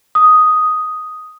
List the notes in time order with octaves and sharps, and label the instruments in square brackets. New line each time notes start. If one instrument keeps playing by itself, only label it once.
[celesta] D#6